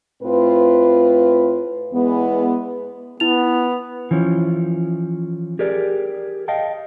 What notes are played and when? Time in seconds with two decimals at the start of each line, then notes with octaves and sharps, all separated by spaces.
0.23 A2 C4 F4 B4
1.93 E2 E3 G#3 B3
3.20 B3 E4 F7
4.11 E3 F3 C#4
5.59 G4 G#4 A#4 D5
6.48 D#5 F5 G5 A5